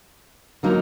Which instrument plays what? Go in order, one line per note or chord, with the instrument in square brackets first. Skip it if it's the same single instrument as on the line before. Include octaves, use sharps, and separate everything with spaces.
[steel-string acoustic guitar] D3 F#3 A#3 D#4